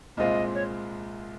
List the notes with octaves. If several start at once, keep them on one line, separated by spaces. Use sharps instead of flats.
C2 A#2 G#3 C4 F4 D#5
C#5